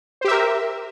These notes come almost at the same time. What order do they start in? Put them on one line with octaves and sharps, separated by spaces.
C5 G4 E5 A#4